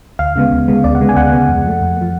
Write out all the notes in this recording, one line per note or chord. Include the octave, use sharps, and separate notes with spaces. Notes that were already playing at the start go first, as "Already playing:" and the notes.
D2 F5
C#3 G#3 B3
D2
C#3 G#3 B3
D2 D5
F#5
C#3 G#3 B3
G#5
D2 F#5
C#3 G#3 B3
F2
F3 A3
F2
F3 A3